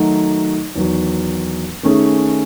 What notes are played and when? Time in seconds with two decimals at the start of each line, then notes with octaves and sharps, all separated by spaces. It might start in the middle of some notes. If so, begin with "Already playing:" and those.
Already playing: D#3 F#3 A3 D#4 F#4
0.76 E2 D#3 F#3
1.83 D#3 A3 C#4 G#4